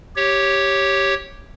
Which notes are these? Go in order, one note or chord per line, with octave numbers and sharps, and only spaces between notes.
G4 C#5